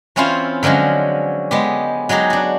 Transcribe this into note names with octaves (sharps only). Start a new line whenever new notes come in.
E3 C4 C#4 E4 F4 C5
D3 F3 F#3 G#3 C#4
G#3 B3 G4
F#3 G#3 D#4 G4 G#4
D4 F#4